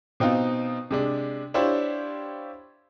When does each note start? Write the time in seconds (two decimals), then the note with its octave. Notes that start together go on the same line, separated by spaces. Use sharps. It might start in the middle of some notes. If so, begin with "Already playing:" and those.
0.20 B2 C4 D#4 F4
0.91 C3 G#3 D4
1.54 D4 E4 F4 G4 C5 C#5